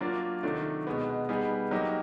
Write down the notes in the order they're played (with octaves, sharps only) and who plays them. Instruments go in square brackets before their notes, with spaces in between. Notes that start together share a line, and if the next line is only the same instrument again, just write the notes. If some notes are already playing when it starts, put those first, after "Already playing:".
[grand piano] F#3 A#3 D4 F4
C3 D#3 F#3 A3 D4
B2 G#3 B3
G3 B3 D#4 G#4
F#3 A#3 D#4 G4